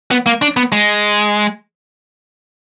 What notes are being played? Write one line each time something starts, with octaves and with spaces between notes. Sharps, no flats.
B3
A#3
D4
B3
G#3